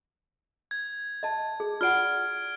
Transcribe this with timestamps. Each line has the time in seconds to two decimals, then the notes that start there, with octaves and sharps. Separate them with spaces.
0.71 G#6
1.23 D#5 A5
1.60 G#4
1.81 F4 D5 F#5 F6 D7